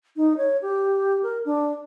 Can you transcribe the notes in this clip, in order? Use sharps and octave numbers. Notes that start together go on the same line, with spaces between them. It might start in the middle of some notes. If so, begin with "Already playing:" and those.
D#4
C#5
G4
A#4
D4